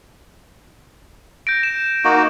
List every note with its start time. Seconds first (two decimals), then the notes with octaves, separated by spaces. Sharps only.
1.47 G6 A#6 D7
1.63 E7
2.04 A#3 D#4 F#4